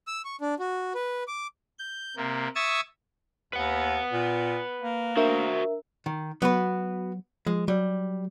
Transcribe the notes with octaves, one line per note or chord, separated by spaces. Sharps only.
E6
C#6
D4
F#4
B4
D6
G6
C3 A#3
E5 C#6 D#6 E6 G#6 A6
D#2 B4 F#5
A#2
A#3
D4 F#4 A#4 C5 E5
D#3
F#3 B3 F#4 B4
F3 G#3
F#3 G3